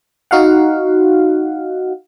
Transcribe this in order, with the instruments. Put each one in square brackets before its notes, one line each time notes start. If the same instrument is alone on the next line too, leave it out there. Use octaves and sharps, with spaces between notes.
[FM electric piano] D#4 F#4 F5 F#5